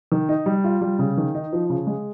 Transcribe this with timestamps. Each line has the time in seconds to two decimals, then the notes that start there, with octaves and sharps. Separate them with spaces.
0.12 D#3
0.29 D#4
0.46 G3
0.64 F4
0.81 G3
0.99 C#3
1.17 D#3
1.35 D#4
1.53 F3
1.70 C#3
1.87 G#3